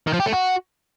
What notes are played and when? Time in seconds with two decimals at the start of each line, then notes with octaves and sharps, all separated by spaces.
0.07 D#3
0.13 F3
0.20 G4
0.26 A3
0.33 F#4